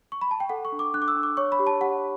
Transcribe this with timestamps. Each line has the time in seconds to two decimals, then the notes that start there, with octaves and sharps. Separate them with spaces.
0.12 C#6
0.21 B5
0.31 A5
0.40 G5
0.49 A4 F#5
0.65 C#6
0.72 D4
0.79 D6
0.94 D4 F#6
1.02 D6
1.08 E6
1.15 D4
1.23 D6
1.37 C#5 C#6
1.52 B5
1.59 G4
1.67 A5
1.81 G4 F#5